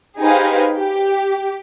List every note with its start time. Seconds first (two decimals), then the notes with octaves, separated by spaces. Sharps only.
0.18 D#4 G4 G#4 B4 C5 F5
0.76 G4